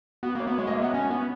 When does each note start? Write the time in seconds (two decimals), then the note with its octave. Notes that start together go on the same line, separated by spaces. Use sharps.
0.23 B3 F#4
0.35 A#3 C#5
0.47 B3
0.58 G#3 C#5
0.67 A#3 D#5
0.75 E5
0.82 B3 F#5
0.93 C#4 G#5
1.10 B3